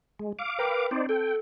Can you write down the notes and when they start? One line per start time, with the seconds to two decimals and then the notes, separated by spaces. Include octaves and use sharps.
0.19 G#3
0.39 F5 D6
0.59 A#4 B4 G5
0.91 C4 D#4 C5 D5
1.09 A4 G5